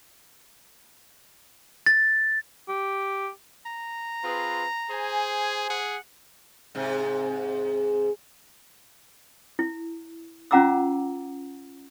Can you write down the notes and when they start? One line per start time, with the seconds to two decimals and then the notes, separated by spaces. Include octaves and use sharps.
1.86 A6
2.69 G4
3.65 A#5
4.24 C4 F4 G#4 B4
4.90 G#4 C5 G#5
5.70 G#4 F#5
6.75 G#2 C3
9.59 E4
10.51 C#4 F4 F#5 A#5 D6 E6